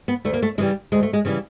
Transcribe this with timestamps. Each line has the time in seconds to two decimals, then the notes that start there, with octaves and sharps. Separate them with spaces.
0.08 B3
0.25 D2 A3
0.33 A#3
0.42 A3
0.58 C#3 E3 G3 G#3
0.92 D2 G#3
1.03 A3
1.13 G#3
1.25 C#3 E3 G3 A3